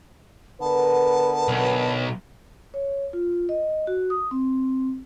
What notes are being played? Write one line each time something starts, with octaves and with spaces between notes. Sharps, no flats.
D3 B3 A#4 B4 A5
B1
C#5
F4
D#5
F#4
D#6
C4